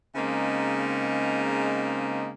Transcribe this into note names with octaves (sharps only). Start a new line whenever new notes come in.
C#3 G#3 A#3 C4 D#4